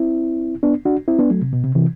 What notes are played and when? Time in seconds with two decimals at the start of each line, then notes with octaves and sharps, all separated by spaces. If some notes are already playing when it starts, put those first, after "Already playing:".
Already playing: C4 E4
0.63 B3 D4
0.85 D4 F#4
1.08 C4 E4
1.19 B3 D4
1.30 F#3 A3
1.42 C3
1.53 B2
1.64 C3
1.75 C3 E3